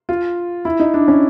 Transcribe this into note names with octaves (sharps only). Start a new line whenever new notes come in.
F4
E4
D#4
D4
C#4